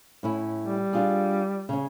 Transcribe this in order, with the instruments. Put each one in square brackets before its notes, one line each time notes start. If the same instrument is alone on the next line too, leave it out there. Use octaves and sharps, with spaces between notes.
[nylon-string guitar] A2 C#4 E4
[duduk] G3
[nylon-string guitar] D4 F4 G#4
C#3 C#4